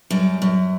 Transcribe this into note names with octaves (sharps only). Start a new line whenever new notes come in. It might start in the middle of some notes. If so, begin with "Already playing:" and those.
F#2 G3
F#2